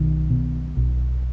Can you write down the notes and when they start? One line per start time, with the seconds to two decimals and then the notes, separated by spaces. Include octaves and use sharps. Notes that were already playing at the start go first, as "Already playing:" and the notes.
Already playing: B1 D#3
0.30 B2
0.77 B1